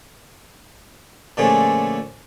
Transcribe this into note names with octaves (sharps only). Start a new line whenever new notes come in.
A#2 D3 F3 A3 C#4 G#4